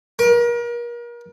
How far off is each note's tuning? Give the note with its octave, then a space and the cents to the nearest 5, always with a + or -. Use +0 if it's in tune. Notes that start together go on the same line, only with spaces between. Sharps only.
A#4 +35